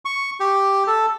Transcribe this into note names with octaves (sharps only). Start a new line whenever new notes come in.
C#6
G4
A4